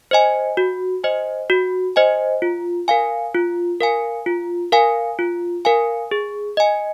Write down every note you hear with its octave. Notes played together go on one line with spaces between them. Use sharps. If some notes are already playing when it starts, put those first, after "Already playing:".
C5 D#5 G#5
F#4
C5 D#5 G#5
F#4
C5 D#5 G#5
F4
A#4 F5 G#5
F4
A#4 F5 G#5
F4
A#4 F5 G#5
F4
A#4 F5 G#5
G#4
D#5 G#5